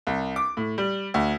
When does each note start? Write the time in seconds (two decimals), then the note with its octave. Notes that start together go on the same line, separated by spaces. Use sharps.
0.07 C2
0.36 D6
0.57 A2
0.78 G3
1.14 D2